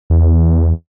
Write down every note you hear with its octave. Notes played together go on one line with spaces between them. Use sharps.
E2